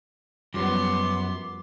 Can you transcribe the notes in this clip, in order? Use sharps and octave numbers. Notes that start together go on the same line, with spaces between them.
F#2 F3 G3 B3 C6 D6